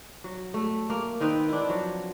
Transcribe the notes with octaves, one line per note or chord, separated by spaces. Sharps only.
F#3
A3
A#3
D#3 C4 D#4 B4
D4 E4
F3 F#3